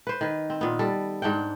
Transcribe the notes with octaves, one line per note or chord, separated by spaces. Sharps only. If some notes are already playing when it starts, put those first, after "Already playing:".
B4 C5
D#3 B4
C4
A#2 B3
G3 A4
G#2 D4 F#5 G5